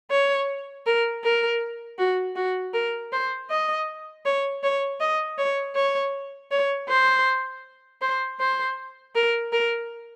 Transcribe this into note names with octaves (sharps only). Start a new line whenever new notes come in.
C#5
A#4
A#4
F#4
F#4
A#4
C5
D#5
C#5
C#5
D#5
C#5
C#5
C#5
C5
C5
C5
A#4
A#4